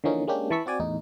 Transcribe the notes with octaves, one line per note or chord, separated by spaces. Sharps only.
D3 E3 F3 A#3 C#4 D#4
G#3 A#3 C#4 D4 G4
E3 A5 B5 C#6 E6 B6
C4 F#4 D5 G#5
E2 A2 D#4